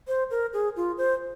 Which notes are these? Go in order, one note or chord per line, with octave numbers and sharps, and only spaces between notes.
C5
A#4
G#4
F4
C5